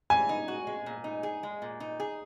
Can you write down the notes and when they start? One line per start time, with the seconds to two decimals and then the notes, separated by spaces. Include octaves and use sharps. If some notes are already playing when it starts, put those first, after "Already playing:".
0.10 E3 G#5
0.29 D#4
0.48 F#4
0.67 G#3
0.86 A#2
1.04 D#4
1.23 G#4
1.43 G#3
1.62 A#2
1.80 D#4
2.00 G#4